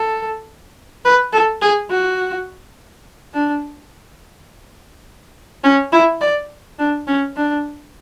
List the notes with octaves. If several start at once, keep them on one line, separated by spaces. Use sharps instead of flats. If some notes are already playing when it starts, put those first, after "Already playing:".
Already playing: A4
B4
A4
G#4
F#4
D4
C#4
E4
D5
D4
C#4
D4